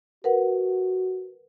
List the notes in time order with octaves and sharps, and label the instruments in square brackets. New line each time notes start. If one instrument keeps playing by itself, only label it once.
[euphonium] F#4 [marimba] A#4 B4 F#5